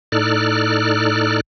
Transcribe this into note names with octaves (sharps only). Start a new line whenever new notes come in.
A2 D#4 A4 D5 F6 F#6